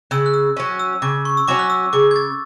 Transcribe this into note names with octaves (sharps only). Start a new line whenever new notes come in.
C#3 E6
F#6
E6
F#3 C#4
E6
C#3 D6
C#6
E6
F#3 C#4 D6
F#6
E6
C#3 D6
G#6
A6